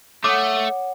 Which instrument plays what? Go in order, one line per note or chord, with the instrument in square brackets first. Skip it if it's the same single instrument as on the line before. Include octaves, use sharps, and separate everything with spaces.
[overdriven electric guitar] A3 [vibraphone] C#5 F#5 [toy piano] D6 D#6